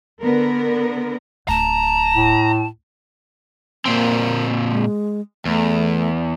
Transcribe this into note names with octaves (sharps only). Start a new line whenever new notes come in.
D3 B3 A#4
D1 A5 A#5
A2
A#2 A#3 C4
G#3
E2 A3